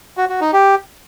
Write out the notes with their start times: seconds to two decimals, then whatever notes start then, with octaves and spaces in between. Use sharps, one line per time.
0.17 F#4
0.29 F#4
0.41 D#4
0.53 G4